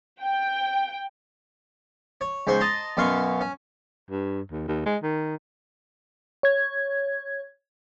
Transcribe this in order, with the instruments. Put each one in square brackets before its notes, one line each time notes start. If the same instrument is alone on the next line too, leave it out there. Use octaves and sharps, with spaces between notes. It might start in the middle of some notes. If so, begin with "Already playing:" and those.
[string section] G5
[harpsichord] C#5
C#2 G#2 C5 C6 C#6
D#5 A5 A#5 C6
F#2 B2 C#4 F5 C6 C#6
C#4
[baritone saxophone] G2
D#2
D#2
G#3
D#3
[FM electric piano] C#5 G#6